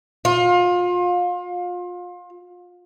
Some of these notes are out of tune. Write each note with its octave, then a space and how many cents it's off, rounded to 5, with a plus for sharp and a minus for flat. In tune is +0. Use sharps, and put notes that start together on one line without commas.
F4 +30